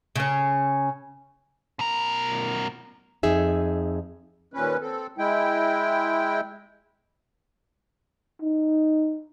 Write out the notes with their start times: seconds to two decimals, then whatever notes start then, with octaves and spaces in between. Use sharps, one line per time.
0.16 C#3 C#4
1.79 B2 A#4
3.23 F2 D#4 G#4 E5
4.54 D#2 A#2 C#4 B4
4.82 C4 A4
5.18 G#3 E4 G5
8.42 D#4